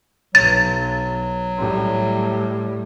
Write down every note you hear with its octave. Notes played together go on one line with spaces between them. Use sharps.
B1 F#3 A6
A2 G3